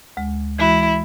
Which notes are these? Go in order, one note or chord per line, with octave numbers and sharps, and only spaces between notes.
D2 G#3
E3 G#3 E4 F#4